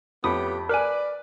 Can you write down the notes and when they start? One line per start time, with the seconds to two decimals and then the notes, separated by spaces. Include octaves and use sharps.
0.24 F2 A2 B3 G4 B5 D#6
0.69 A#4 B4 D5 G#5 F#6